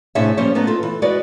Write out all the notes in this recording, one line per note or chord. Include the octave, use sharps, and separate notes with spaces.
A2 C3 D4 G#4 C#5 E5
F3 G3 A#3 C#4 C5 C#5
A3 B3 D#4
F4 A4
E3
G#3 F#4 B4 D5